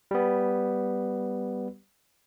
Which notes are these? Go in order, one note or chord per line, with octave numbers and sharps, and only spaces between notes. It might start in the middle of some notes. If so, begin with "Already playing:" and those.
G3 B3